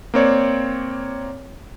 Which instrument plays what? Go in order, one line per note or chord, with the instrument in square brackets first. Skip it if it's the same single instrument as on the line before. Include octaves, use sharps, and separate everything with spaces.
[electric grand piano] A#3 C4 C#5 D5